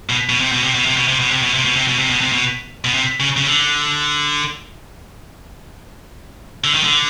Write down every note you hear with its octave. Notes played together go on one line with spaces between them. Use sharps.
B2
B2
C3
B2
C3
B2
C3
B2
C3
B2
C3
B2
C3
B2
C3
B2
C3
B2
C3
B2
B2
C3
C#3
C#3
D3
D3
D#3
D3